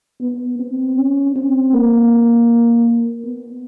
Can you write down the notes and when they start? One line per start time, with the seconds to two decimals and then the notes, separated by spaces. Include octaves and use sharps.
0.21 B3
0.59 C4
0.97 C#4
1.35 C4
1.73 A#3
3.25 B3